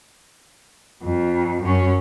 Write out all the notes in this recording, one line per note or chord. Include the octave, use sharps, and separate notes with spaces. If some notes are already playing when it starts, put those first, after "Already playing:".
F2
F#2 C#4